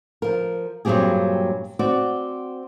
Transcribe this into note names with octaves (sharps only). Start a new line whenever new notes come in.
F3 A#4
G2 A#2 F#3 C4 G4 G#4
C4 F#4 D5